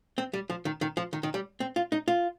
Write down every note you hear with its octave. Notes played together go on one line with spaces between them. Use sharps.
C4
G3
F3
D#3
D#3
F3
D#3
D#3
G3
C4
F4
D#4
F4